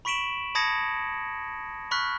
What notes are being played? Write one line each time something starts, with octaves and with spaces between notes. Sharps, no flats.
B5 C#6 B6 D7 E7 F#7
A5 B5 D#6 G#6 A#6 C#7
B5 C#6 F6 F#6 B6